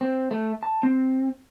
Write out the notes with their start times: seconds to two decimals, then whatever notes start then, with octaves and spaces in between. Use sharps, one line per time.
0.01 C4
0.31 A3
0.63 A5
0.83 C4